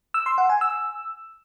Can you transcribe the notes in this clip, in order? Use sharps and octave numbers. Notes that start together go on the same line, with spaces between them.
E6
C6
F#5
G#5
E6